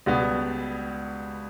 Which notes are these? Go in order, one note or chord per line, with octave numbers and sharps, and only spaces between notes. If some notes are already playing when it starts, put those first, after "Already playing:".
C#2 B2 G3 B3